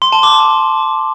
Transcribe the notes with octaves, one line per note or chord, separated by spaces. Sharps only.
C6
A5
D6